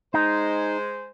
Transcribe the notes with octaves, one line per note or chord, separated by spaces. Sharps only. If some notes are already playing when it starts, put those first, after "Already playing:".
G#3 D#4 C5